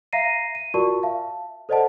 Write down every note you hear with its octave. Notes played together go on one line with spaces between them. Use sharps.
E5 F5 A#5 A#6 C7 D#7
D#7
F4 F#4 A#4 D5 A5 C#6
E5 F5 A5
A4 C5 D5 D#5 F#5 A5